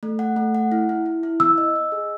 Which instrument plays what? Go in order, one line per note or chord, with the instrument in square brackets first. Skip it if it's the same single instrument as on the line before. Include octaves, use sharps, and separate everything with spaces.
[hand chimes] A3
F#5
A3
F#5
E4
E4
E4
E4
[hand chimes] B3 [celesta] E6
[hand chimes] D#5
D#5
G#4